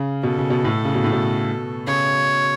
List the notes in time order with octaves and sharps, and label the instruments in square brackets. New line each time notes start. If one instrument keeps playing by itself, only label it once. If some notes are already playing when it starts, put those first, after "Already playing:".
Already playing: [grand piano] C#3
[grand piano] B2 [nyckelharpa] A4
[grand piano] C#3
B2
A2
C#3
B2
A2
B2
[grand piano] C#3 [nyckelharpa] C#5